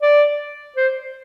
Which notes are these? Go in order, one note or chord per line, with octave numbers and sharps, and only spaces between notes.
D5
C5